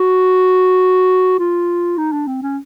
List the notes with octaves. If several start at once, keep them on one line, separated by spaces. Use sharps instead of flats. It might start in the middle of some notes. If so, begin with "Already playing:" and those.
Already playing: F#4
F4
D#4
D4
C4
C#4